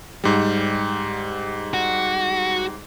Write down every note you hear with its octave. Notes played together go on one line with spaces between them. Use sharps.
G#2 G3
F#4